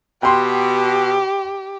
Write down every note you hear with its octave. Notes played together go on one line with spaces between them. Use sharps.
B2 G4 G5 C6